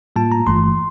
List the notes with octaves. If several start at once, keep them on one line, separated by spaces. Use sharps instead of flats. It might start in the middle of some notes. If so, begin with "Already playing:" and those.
A2 G3 A#3 F4 A5
A#5
G1 G2 E3 A3 C6